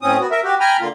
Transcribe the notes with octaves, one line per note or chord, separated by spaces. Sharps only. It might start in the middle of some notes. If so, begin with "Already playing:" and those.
A2 C4 C#4 D#6
B3 F#4
A#4 E5
F#4 G4
G5 G#5 A#5 B5 F6
D3 A#3 F4